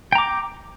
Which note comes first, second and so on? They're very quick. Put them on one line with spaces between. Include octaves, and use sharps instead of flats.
G5 A#5 D6